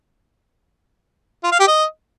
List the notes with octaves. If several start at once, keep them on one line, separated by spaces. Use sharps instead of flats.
F4
F5
G4
D#5